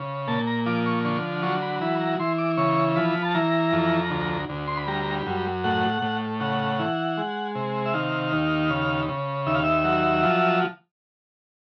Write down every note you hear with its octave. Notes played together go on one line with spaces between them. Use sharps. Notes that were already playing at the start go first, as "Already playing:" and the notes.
Already playing: C#3
A#2 A5
A#5
F3 D6
C#6
D3 C#6
F#3 C#6
B5
E3 B5
A#5
E3 C6
D6
C#3 C#6
F3 B5
A5
E3 A#5
F2
D2
D2
C6
B5
G3 A#5
F#2
A2 F#5
A2
C#3 F#5
E3
G#3
C3
E5
D#3 F5
D#2
C#3
C#3
D#2 E5
F5
E5
F#3
F3